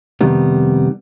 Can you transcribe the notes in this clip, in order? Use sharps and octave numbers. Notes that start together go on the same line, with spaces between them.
F2 C3 D#3 G3 B3